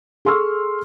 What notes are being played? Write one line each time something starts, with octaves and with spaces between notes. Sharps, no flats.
G#4 A4 C6 C#6 E6 F6